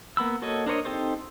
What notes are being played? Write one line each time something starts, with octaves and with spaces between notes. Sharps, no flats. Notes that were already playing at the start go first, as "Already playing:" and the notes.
A#3 B3 B5 E6
A#3 F#4 A4 C#5 D#5
D4 A#4 C5 C#5 D#5
C4 D#4 G4 A4 C5